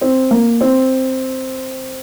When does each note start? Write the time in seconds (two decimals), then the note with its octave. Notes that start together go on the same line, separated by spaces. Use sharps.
0.01 C4
0.31 A#3
0.61 C4